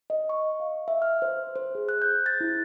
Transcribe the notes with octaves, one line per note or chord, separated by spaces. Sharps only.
D#5
C#6
F5
E5
F6
C5
C5
G#4
F#6
G6
A6
E4